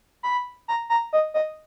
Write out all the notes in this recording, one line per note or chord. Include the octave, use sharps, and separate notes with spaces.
B5
A#5
A#5
D#5
D#5